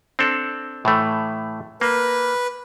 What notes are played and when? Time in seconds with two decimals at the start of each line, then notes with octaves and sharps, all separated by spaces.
0.19 C4 D4 A4
0.85 A2 E3 A3
1.81 A#3 B4